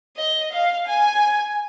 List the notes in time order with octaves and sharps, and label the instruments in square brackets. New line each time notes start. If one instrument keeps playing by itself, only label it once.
[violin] D#5
F5
G#5